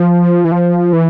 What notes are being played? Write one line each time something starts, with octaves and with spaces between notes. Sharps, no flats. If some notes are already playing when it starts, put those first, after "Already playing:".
Already playing: F3
E3
F3
E3